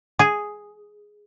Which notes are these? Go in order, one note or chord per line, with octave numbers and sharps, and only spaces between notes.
G#4